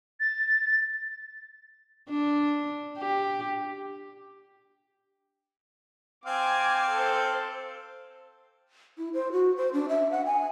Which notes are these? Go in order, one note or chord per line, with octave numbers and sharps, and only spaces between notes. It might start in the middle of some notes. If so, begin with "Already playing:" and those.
A6
D4
G4
C4 F5 G#5 D6
A4 C5
E4
C5
F#4
C5
D4
E5
F#5
G#5